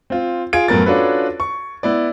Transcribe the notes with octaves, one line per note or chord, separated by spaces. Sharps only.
C4 F4
F4 G#4 G#6 D7
F#2 A3 B3 A#4 A6
C#4 D4 F4 F#4 A4 B4
C#6
B3 E4 D5